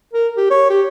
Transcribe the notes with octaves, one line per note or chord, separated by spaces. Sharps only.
A#4
G4
C#5
G4